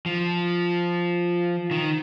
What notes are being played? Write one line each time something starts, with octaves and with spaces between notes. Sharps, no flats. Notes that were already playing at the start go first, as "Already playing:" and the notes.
F3
D#3